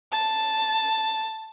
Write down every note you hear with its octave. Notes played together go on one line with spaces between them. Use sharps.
A5